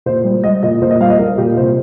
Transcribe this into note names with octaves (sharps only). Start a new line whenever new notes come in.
A#2 C5
G3
G3 D#5
A#2 D#5
A#2 C5
D#5
G3 F5
D#5
G3 A#4
A#2 G4
C3 C5